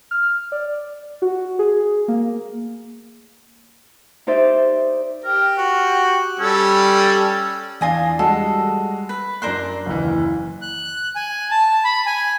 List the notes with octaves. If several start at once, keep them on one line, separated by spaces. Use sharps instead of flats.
F6
D5
F#4
G#4
A#3
D#4 G4 C5 D5 E5
G4 A#4
F#4
G3 C#4 A4 E6
E2 D4 F4 G#5 D#6 A#6
G3 G#3 F#4 A4
B4
F#2 D4 A#4 C5 C6 F#6
F#1 D#2 E3
F#6
G#5
A5
B5
G#5